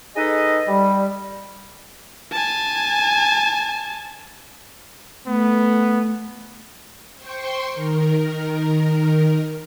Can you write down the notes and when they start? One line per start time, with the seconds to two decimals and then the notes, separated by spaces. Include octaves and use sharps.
0.16 D#4 G#4 A4 B4 D#5
0.68 G3
2.32 G#5 A5
5.27 A3 B3
7.16 C5 G5 C6 C#6
7.72 D#3 A#4